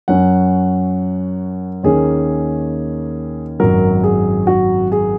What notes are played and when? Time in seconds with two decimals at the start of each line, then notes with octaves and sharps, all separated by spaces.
0.08 F#2 F#3 C#4 F#5
1.84 D#2 D#3 A#3 C#4 G#4
3.60 G#1 F#2 F#3 A#4
4.04 G#4
4.47 F#4
4.92 G#4